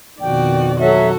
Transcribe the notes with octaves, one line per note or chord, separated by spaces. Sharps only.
F2 B2 D#3 F#4 D5 G5
F#3 F#4 A4 E5